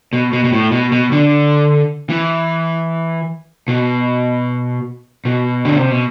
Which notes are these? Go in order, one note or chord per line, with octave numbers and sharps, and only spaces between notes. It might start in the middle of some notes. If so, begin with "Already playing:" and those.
B2
B2
B2
A2
B2
B2
D3
E3
B2
B2
D3
C3
B2